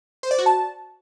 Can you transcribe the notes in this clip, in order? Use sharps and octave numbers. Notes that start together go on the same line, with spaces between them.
C5
D5
F#4
A5